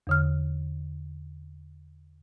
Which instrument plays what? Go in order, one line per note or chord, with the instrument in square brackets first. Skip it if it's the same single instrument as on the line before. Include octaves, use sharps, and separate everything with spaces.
[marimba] E2 D3 F6